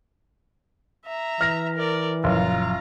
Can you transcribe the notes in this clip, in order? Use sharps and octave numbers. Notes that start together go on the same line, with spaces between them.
E5 A#5
E3 F6 A#6
A#4 D5
F#1 A#2 F3 F4 A#5